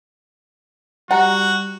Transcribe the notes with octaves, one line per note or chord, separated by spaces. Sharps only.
G3 F#4 F#5 A#5